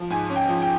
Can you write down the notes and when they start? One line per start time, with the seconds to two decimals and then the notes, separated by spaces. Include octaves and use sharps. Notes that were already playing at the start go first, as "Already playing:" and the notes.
Already playing: F3
0.10 G#2 G#5
0.30 C#4
0.36 G5
0.48 F3
0.62 G5